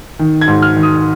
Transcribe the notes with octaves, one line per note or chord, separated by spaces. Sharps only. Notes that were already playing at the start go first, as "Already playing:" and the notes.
D#3
G#6
G#2
F6
D#3
D#6